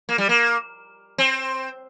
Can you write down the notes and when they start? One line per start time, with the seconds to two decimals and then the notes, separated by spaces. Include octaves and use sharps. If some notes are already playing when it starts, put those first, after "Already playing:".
0.09 A#3
0.18 G3
0.29 A#3
1.18 C4